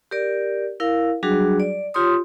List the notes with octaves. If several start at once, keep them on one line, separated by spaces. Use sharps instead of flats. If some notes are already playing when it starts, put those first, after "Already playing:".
G4 A#4 D5
E4 A#4 F5
F#3 G3 D4 F#4 G#4
D5
F4 G4 C#5 C6 D#6